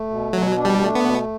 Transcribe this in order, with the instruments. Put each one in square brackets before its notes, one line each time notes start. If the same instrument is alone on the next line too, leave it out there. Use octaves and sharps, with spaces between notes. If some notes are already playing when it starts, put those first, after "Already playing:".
Already playing: [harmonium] A3
B2
[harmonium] B2 [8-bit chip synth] F#3
[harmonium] D4
[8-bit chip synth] G3
[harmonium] A3
[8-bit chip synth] B3
[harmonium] B2